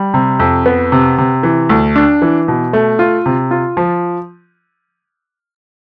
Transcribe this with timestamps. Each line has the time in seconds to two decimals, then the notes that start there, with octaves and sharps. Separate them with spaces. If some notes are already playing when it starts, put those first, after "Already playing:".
Already playing: G3
0.14 C3
0.39 F2
0.66 B3
0.92 C3
1.18 C3
1.43 E3
1.69 D2
1.96 D4
2.22 E3
2.48 B2
2.73 A3
2.99 F4
3.26 C3
3.51 F4
3.77 F3